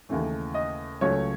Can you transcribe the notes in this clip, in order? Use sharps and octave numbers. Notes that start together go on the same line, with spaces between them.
D#2 C#3 E3 A3
D#5
C#2 C#3 F#3 A3 C#5